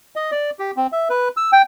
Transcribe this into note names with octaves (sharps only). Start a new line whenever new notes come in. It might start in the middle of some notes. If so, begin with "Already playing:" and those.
D#5
D5
G4
C4
E5
B4
E6
G5